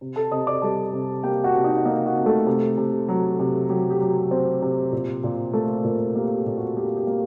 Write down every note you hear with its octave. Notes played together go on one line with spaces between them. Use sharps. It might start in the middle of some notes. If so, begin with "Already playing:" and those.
C3
A4 A5
C3 D#5 D#6
D5 D6
G3 A4 A5
C3
A#3 G4 G5
F#4 F#5
C3
D#4 D#5
F#5
A#3 D#4 D#5
F#4 F#5
C3
A3 A4
C3
C3
F#3
C3
F#3 G4
G4
F#3
C4
C3
A#2
A#2
A3 A#3 A4
A#2 A#3 A#4
A#3 G4
G4
A#2
F#4
A#3 G4
G4
A#3